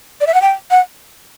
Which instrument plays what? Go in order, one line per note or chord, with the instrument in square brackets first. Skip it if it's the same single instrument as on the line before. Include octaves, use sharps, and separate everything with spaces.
[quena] D5
E5
F#5
G5
F#5